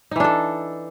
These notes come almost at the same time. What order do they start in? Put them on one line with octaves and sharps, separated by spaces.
D#4 E3 D4 A4